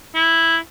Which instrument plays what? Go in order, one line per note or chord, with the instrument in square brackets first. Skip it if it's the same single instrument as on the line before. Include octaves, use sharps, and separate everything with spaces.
[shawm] E4